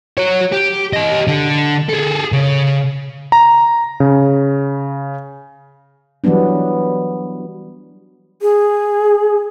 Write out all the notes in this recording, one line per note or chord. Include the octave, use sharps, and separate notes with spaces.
F#4 C#5
G4
G4 D#5
D3
G#4 A4
C#3
A#5
C#3
E3 F#3 G3 B3 D4
G#4